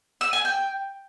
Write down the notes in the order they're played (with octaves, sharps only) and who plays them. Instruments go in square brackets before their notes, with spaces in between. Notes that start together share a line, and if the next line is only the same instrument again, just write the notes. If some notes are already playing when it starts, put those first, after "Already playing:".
[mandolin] E6
G#5
G5